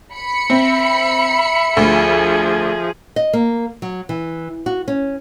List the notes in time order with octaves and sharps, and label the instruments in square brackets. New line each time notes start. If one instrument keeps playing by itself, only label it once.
[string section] B5 C#7
[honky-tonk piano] C4 [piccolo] E5
[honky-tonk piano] D2 [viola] F3 G#4
[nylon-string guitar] D#5
A#3
F#3
E3
F#4
C#4